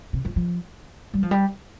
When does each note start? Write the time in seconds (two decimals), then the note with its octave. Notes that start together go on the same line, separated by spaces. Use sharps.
0.13 C3
0.25 F3
0.36 F3
1.14 G3
1.23 F3
1.31 G3